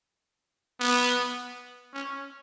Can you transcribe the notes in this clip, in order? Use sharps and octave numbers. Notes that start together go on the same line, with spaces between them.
B3
C#4